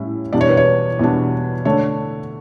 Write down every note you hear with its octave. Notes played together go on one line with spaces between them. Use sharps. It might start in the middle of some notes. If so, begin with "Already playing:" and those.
Already playing: A2 G3 C#4 E4
E2 B2 G3 D4 D5
C#5
B4
C#5
E2 B2 G3 D4
D3 A3 D4 C#5